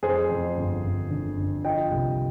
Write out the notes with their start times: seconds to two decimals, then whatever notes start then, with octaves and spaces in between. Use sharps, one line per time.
0.03 F2 G#4 C5
0.29 F2
0.57 G1
0.84 G1
1.11 D3
1.37 G1
1.65 F3 D#5 G5
1.91 C2